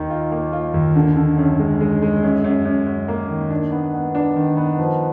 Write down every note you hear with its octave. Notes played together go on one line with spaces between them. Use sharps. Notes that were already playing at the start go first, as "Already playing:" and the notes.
Already playing: D#2 D#3
F4
A#3
F4
D#2
D3
D3
F#2
G#3
G#3
G#3
F#2
F#2
F#2
F#2
A#3
D#3
D4
B3
B3
D4
D#3
B3
F3